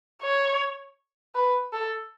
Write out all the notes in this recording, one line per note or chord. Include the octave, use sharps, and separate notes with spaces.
C#5
B4
A4